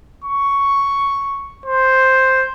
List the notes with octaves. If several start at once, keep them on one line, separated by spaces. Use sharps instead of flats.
C#6
C5